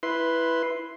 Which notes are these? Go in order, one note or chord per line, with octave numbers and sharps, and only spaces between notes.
E4 B4 C6